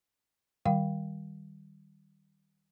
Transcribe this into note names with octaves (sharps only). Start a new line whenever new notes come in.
D#3 G3 F5 G5